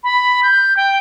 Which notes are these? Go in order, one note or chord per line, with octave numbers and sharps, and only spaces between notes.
B5
G6
G5